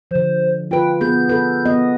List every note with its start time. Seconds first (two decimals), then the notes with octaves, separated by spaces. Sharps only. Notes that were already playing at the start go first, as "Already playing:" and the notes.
0.11 D3 F3 C5
0.71 F4 B4 G5
1.01 B3 G#4 G6
1.29 A4 B4
1.65 B3 D#5